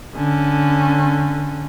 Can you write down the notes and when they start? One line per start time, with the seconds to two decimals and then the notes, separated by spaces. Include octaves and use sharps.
0.16 D3 C#4